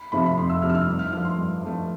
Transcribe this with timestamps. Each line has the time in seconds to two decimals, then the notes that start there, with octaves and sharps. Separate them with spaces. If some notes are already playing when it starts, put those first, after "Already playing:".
Already playing: B5
0.12 C3 F3 A3 B5
0.26 B5
0.37 F2 C6
0.50 E6
0.62 C3 F3 A3 F6
0.69 E6
0.75 F6
0.88 G2
0.99 F6
1.12 F3 A3 F6
1.25 C6
1.38 G2
1.63 F3 A3